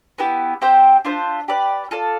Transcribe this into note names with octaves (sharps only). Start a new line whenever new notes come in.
B3 E4 G4
C4 G4 C5 G5
D4 F4 C5 E5
G4 B4 D5
F4 A4 D5